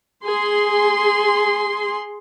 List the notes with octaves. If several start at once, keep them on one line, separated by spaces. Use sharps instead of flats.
G#4 C6